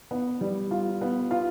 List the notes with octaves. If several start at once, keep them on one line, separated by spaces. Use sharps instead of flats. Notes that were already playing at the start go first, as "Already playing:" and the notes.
B3
G3
F4
B3
F4